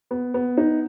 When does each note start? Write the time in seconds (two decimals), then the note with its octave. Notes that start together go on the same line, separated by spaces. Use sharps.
0.11 B3
0.34 B3
0.57 D#4